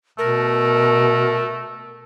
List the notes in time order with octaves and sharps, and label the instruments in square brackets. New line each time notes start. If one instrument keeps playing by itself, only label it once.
[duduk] B2 [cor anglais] A3 [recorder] A#4